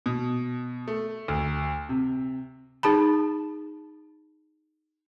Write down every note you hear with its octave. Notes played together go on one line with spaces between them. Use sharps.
B2
A3
D2
C3
D#4 G#4 A5 B5